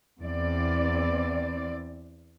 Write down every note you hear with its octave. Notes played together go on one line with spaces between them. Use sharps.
E2 C4 D5